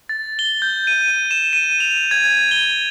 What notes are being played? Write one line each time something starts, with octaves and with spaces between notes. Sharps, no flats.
A6
G7
G6
D#7
E7
D#7
F7
G#6
G7